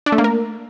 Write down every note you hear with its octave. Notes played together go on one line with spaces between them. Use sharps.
D4
A3
A#3
A#4